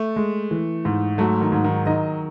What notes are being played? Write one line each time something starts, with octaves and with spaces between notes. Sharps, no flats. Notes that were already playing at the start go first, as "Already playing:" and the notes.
Already playing: A3
G#3
E3
G#2
F#3 A3
D#3
G#2
D#3
D#3 D#5